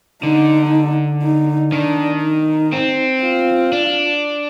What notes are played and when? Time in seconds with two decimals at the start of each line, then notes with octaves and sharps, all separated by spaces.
0.23 D3 D#4
1.23 D#4
1.72 D#3 D4
2.23 D#4
2.72 C4
3.23 F4
3.72 D4